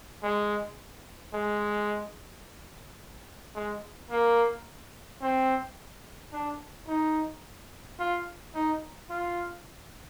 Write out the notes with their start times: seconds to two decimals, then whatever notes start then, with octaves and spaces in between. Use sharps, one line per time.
0.23 G#3
1.34 G#3
3.55 G#3
4.11 A#3
5.21 C4
6.32 D4
6.88 D#4
7.99 F4
8.55 D#4
9.10 F4